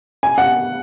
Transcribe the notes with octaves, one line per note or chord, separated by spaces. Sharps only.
G#5
F#5